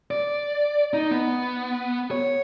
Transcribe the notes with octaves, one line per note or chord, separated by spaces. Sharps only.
D5
D#4
B3
C#5